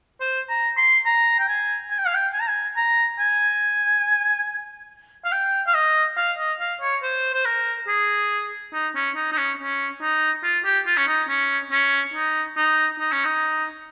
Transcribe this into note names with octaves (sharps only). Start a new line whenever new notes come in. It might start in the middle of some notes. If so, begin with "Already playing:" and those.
C5
A#5
C6
A#5
G5
G#5
G#5
G5
F5
G5
G#5
A#5
G#5
A#5
G#5
F5
G5
F5
D#5
F5
D#5
F5
C#5
C5
C5
A#4
G#4
D#4
C#4
D#4
D#4
C#4
C#4
D#4
F4
G4
F4
C#4
D#4
C#4
C#4
D#4
D#4
D#4
C#4
D#4